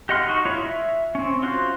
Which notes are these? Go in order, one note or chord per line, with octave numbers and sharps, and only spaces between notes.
G4 D#5 F#5 C6 F6
D#4 F#4
E4 F4 C#5
E5
C4 C#4
C#4 F4 F#4 C5